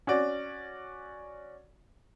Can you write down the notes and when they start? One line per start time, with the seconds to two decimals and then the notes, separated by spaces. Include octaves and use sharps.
0.07 C#4 F#4 D5